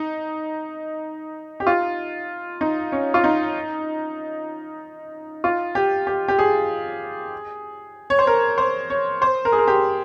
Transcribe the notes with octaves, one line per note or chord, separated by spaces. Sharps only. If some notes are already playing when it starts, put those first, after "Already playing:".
Already playing: D#4
G4
F4
D#4
C#4
F4
D#4
F4
G4
G4
G4
G#4
C#5
C5
A#4
C5
C#5
C5
A#4
G#4
A#4
G4